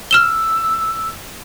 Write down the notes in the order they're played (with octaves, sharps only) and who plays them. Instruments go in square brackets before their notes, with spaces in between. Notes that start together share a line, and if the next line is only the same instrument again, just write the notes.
[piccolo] E6 [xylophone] F6 E7 G7